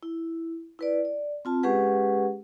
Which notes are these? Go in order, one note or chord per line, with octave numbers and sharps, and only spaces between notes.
E4
E4 B4 D5
D5
C4 F4 A5
G#3 C#4 G4 G#4 B4 F#5